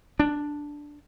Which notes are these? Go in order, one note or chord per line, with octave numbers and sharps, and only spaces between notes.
D4